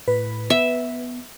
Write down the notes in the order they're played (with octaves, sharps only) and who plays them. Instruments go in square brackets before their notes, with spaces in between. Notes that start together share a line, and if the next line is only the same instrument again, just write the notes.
[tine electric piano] A2 [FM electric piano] B4
[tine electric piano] B3 [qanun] E5